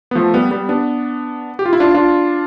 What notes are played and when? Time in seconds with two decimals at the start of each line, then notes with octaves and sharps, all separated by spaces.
0.11 B3
0.15 F3 A3
0.34 G3 B3
0.51 G3 B3
0.69 B3 D4
1.59 G4
1.66 F4
1.73 E4
1.80 D4 F4
1.94 D4 F4